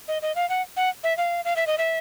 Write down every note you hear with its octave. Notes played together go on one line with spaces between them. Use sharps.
D#5
D#5
F5
F#5
F#5
E5
F5
F5
E5
D#5
E5